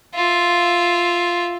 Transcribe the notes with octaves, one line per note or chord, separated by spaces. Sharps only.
F4 E5